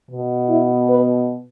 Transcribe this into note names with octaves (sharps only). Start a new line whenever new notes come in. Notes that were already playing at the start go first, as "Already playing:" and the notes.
B2 B3
E4
B4